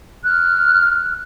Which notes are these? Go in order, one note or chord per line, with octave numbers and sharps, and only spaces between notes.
F6 F#6